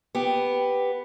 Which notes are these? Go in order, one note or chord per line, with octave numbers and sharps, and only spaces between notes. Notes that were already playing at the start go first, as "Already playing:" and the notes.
B3 G4